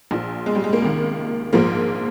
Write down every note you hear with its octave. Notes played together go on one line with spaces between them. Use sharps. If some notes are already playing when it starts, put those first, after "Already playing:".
A#1 A#2 F3
G#3
G3
G#3
A#3
C#2 C3 D#3
A#1 G#2 F3 A#3